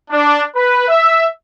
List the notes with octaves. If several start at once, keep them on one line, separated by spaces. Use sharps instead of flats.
D4
B4
E5